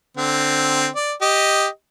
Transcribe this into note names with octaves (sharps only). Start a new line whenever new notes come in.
D3 C4
D5
G4 D#5